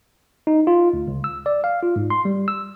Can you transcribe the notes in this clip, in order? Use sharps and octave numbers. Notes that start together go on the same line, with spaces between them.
D#4
F4
D2
C#2
E6
D5
F5
F4
G#2
C6
G3
E6